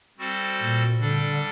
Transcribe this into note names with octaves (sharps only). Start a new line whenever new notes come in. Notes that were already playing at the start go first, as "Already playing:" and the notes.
G3 C4 F#4 A4 C5
A#2
D3 G3 D4 A4